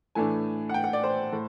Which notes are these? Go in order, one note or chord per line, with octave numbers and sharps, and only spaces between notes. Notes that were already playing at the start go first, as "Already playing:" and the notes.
A2 E3 A3 D4 G#5
F#5
G5
F#5
D5
C5
A2